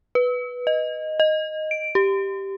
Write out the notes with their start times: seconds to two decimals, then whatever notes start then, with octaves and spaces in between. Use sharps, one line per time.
0.15 B4
0.67 D#5
1.20 D#5
1.71 D7
1.95 G4